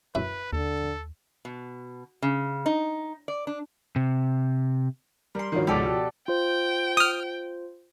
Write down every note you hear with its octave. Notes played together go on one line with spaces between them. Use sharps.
F#2 E4 B4
D#2 D3 A4
B2
C#3
D#4
D5
D4
C3
G3 A#4 C6
G2 D#3 F3 F#4 C#5
C#2 G#2 B2 G4 A4 D5
B2
F4 C5 G5
D#6 F6